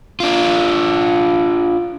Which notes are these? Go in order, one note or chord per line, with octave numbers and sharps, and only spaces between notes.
D4 F4